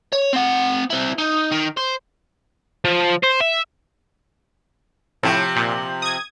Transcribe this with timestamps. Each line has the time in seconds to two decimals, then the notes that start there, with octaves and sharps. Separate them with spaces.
0.13 C#5
0.33 C4 F#5
0.90 C4 E4
1.18 D#4
1.52 D#3
1.77 C5
2.85 F3
3.24 C5
3.40 E5
5.23 A2 C3 F3
5.56 A#2
6.02 D#6 G#6